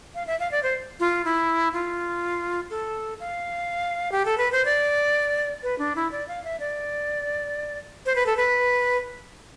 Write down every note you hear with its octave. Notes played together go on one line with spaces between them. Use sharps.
F5
E5
F5
D5
C5
F4
E4
F4
A4
F5
G4
A4
B4
C5
D5
B4
D4
E4
D5
F5
E5
D5
C5
B4
A4
B4